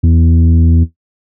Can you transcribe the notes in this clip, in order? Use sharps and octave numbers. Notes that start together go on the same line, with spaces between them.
E2